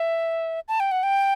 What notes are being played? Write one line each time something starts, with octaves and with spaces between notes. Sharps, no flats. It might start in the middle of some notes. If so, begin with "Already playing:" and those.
Already playing: E5
A5
G5
F#5
G5